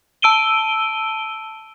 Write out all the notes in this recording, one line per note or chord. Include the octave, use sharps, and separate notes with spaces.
A5 E6 D7 D#7 G7